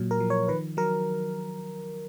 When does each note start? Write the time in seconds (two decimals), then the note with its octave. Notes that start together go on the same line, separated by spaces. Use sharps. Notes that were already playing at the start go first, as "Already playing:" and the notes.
Already playing: A#2 F#3
0.11 A#4
0.20 F3
0.30 C#5
0.48 D#3 B4
0.77 F#3 A#4